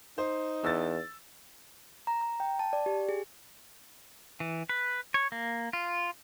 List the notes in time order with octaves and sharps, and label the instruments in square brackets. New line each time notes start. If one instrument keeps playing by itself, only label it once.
[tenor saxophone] D#4 [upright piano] C5
[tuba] E2 [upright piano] E6 A6
[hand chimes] A#5
A#5
G5
A5
D5
G4
G#4
[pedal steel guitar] E3
B4
C#5
A#3
F4